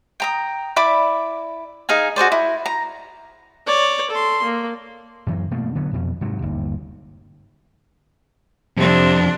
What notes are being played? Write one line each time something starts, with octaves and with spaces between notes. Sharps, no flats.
G5 A#5 D#6
E4 D5 B5 D6
D#4 G#4 F5 G#5
F#4 G#4 C5 D5
E4
A#5
C#5 D5
A4 C6
A#3
F#2 E3 F#3
B2 A3 A#3
D3 F#3 B3
F2 B2
G#2 C3 F#3
G1 D#2
F2 C3 C4 D4